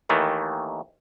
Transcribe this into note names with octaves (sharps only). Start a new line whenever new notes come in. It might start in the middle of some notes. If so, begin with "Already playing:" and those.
D#2 D#3 E3 A3